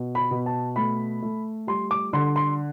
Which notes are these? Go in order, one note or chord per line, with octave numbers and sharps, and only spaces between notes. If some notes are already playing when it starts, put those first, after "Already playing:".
Already playing: B2
B5
B2
A5
A3 B5
A3
G3 C6
D6
D3 C6
C6